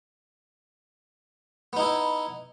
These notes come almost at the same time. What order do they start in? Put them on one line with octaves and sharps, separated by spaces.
B3 D#4 E4